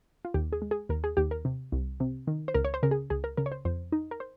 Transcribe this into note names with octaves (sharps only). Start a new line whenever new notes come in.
F4
D#2 G4
G#4
G#3
G#4
D#2 A#4
G#4
D#2 G4
A#4
C3
C2
C3
D#3
C5
C#2 A#4
C#5
C5
C#3 A#4
G#4
C#2 G#4
A#4
C#3 A#4
C#5
C5
F2 C5
D#4
A#4
C5